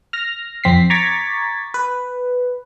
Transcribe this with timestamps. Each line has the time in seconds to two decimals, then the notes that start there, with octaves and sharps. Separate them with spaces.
0.13 F6 A#6
0.64 F2 C4 B6 C7
0.90 A#5 C#6 D6 G#6 A6 B6
1.74 B4